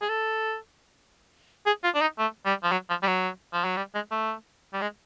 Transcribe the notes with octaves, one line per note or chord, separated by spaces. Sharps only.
G#4
A4
G#4
F4
D4
D#4
A3
G3
F3
F#3
F3
G3
F#3
F3
F#3
G3
G#3
A3
G3
G#3